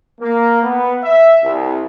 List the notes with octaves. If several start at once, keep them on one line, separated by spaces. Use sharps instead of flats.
A#3
B3
E5
C2